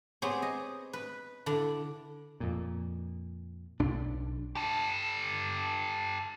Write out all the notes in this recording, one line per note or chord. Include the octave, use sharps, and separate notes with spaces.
B3 C4 G4 G#4 C5 C#5
D#5
B4
D3 D4 E4
F2 A#2
B1 D4
G4 A4